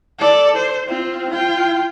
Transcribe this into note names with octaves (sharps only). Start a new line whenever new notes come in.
A4 D5
C5
C4 F4
F4 G5